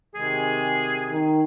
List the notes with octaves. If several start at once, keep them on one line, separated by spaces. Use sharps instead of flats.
C3 D#3 G#3 G#4
D#3